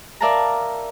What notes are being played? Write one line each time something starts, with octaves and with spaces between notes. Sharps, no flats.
A#4 D5 E5 F5 A5 A#5